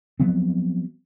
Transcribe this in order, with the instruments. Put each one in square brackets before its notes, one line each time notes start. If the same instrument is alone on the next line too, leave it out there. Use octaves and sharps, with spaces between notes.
[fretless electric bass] F3 F#3 B3 C4